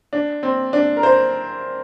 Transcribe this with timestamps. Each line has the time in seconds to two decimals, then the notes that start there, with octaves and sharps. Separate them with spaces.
0.13 D4
0.43 C4
0.73 D4
0.97 A#4
1.03 C5